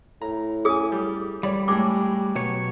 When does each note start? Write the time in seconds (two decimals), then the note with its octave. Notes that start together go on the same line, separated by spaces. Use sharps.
0.22 A2 A#5
0.65 C#4 G#4 G#5 D#6
0.92 G3
1.43 G3 C#5 D5 B5
1.68 A2 G#3 G4 D6
2.35 B2 F#3 C#5